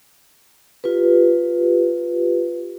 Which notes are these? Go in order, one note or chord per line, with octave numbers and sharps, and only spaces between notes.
F4 G4 B4